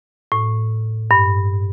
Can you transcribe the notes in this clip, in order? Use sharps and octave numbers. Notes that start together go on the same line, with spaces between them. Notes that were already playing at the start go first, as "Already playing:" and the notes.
A2
G2